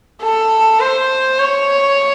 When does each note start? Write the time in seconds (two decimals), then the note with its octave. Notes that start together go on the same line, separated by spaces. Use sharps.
0.22 A4
0.80 C5
1.39 C#5